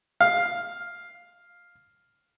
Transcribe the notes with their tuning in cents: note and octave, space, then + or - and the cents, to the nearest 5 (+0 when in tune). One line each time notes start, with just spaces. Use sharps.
F5 +5